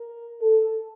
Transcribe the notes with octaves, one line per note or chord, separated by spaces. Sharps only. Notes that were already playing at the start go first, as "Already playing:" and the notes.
Already playing: A#4
A4